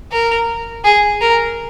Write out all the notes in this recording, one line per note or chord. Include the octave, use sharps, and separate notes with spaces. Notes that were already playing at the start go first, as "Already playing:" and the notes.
A#4
G#4
A#4